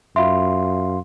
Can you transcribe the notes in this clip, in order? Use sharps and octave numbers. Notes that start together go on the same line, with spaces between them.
F#2 F4 E5 F5 C6